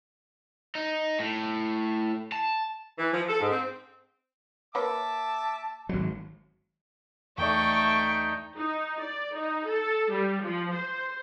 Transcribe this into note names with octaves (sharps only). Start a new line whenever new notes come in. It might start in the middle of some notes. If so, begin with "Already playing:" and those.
D#4
A2
A5
E3
F3
A4
G#2
C4
A#3 B4 C#5 E5 A5 D6
G#1 F#3
E2 A3 D#4 D5 G5 C#6 G6
D#4
D5
D#4
A4
G3
F3
C5